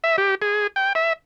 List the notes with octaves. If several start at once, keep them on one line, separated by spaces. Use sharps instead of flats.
E5
G4
G#4
G5
E5